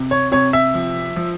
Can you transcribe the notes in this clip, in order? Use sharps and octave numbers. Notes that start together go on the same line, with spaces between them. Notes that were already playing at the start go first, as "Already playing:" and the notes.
Already playing: C3
C#5
C3 C#5
E5
F3
F3